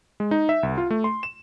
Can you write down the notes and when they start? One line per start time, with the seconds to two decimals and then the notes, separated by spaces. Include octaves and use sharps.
0.20 G#3
0.31 D#4
0.49 E5
0.63 C2
0.78 F4
0.91 A3
1.04 C6
1.23 E7